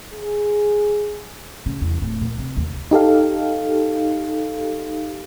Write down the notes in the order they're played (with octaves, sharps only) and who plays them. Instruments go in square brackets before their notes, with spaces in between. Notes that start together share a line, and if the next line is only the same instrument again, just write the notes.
[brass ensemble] G#4
[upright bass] C#3
E2
D1
A#2
C3
D#2
[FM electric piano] D#4 G4 A4 F5